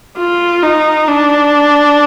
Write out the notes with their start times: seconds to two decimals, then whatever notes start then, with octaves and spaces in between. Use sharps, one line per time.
0.17 F4
0.63 D#4
1.08 D4